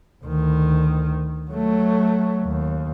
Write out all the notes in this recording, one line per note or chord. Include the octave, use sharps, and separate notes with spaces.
D2 D#3
F#3 A3
D#2